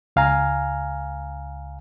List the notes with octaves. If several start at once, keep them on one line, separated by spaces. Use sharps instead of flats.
C#2 F5 G#5 A#5